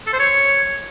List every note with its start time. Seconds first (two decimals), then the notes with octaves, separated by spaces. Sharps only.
0.07 A4
0.13 C5
0.20 C#5